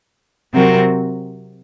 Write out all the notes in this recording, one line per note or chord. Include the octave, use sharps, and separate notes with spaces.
C3 F#3 C4 F#4 A#4